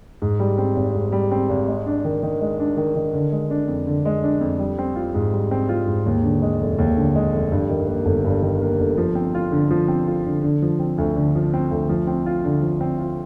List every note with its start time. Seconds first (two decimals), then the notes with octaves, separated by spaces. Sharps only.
0.22 G#2
0.39 G3
0.58 C4
0.76 G#1
0.94 G#2
1.12 G3
1.31 C4
1.49 G#1
1.68 G#3
1.86 D4
2.04 D#3
2.23 D#3
2.41 G#3
2.60 D4
2.77 D#3
2.95 D#3
3.13 D3
3.32 G#3
3.51 D4
3.68 F2
3.87 D3
4.05 G#3
4.24 D4
4.41 F2
4.59 G3
4.78 C4
4.96 F4
5.15 G#2
5.32 G3
5.51 C4
5.69 F4
5.87 G#2
6.06 D#2
6.23 D3
6.42 G#3
6.61 F1
6.78 D#2
6.97 D3
7.15 G#3
7.33 F1
7.52 G2
7.69 D#3
7.87 A#3
8.06 G1
8.25 G2
8.42 D#3
8.61 A#3
8.80 G1
8.97 F3
9.15 C4
9.35 F4
9.52 D3
9.71 F3
9.88 C4
10.07 F4
10.26 D3
10.43 D3
10.62 F3
10.79 C4
10.98 D2
11.16 D3
11.35 F3
11.54 C4
11.71 D2
11.89 F3
12.07 C4
12.26 F4
12.44 D3
12.62 F3
12.81 C4
12.98 F4